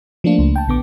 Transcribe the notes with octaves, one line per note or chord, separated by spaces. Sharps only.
F3 A3 A#3 D4 F4
C#2
G5 A5
A#1 D3 B3 D6